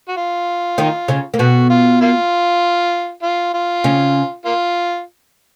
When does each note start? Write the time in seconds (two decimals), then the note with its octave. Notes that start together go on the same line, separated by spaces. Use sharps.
0.09 F#4
0.17 F4
0.78 D#3 D#4
1.08 C#3 C#4
1.34 A#3
1.39 B2 B3 F#4
1.70 F4
2.01 A#3 F4
3.23 F4
3.54 F4
3.84 C#3 C#4
4.45 A#3 F4